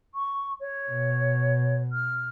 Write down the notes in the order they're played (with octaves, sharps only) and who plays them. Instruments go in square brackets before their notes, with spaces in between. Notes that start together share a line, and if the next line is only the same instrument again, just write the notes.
[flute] C#6
C#5
[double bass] B2
[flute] F6